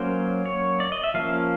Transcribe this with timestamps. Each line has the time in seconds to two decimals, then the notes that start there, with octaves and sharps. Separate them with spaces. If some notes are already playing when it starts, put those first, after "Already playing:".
Already playing: F#3 A#3 C#4 C5
0.46 C#5
0.80 D5
0.92 D#5
1.04 E5
1.14 F3 A#3 C#4 F5